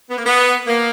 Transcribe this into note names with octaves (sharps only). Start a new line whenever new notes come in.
B3
A#3
B3
A#3